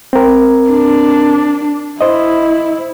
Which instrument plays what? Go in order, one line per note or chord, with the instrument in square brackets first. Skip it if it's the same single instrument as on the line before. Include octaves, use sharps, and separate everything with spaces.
[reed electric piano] C4 A#4
[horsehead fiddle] D4
[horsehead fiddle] E4 [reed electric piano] C5 D#5